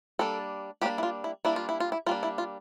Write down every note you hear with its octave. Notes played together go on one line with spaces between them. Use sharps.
G3 A#3 D4 A4
G3 A#3 D4 G4
E4
F4
E4
G3 A#3 D4 E4
F4
E4
F4
E4
G3 A#3 D4 F4
E4
F4